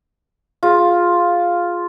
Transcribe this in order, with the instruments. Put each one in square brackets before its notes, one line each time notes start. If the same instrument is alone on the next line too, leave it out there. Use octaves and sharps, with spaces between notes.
[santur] F4 [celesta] G#4 F5